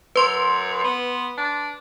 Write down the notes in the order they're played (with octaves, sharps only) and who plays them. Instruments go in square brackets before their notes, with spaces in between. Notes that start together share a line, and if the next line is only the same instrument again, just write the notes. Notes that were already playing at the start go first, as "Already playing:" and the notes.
[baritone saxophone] F#2 [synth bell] B4 C6
[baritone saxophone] B3
D4